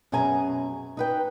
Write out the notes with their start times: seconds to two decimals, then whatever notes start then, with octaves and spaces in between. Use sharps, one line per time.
0.12 F#2 B2 C#4 G#4 G#5 A#5
0.97 D#4 B4 G5